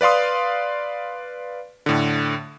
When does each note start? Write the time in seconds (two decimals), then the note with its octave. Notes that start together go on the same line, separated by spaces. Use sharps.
0.01 B4 D5 F5 C6 D#6
1.86 A2 D3